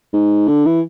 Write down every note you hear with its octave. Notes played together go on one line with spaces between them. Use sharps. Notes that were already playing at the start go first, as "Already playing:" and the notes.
G#2
D3
E3